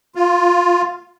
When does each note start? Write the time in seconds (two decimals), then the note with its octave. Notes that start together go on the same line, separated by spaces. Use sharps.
0.15 F4